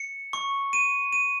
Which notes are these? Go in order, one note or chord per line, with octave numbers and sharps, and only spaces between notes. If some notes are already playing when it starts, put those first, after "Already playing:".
Already playing: C#7
C#6
D#7
D#7